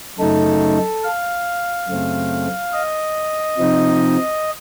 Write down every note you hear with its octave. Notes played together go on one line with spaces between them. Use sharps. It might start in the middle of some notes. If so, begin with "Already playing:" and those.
F#2 C#3 A3 D#4 A4
F5
F#2 C#3 A3 C4
D#5
C3 F3 C4 D#4